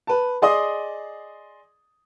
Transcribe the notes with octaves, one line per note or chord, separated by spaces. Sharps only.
B4 A5
G#4 D5 D#5 C6 D#6